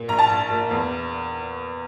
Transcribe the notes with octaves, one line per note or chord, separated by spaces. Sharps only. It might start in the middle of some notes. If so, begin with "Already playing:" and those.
Already playing: A#2
A#1 A#5
A5
A#1
A#2
E2